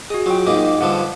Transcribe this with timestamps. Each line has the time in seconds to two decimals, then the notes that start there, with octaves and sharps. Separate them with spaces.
0.10 F#4 G#4 D#5
0.26 F#3 F4 G5
0.47 G#2 A#3 D#4 D6
0.81 G2 D3 F3 F#5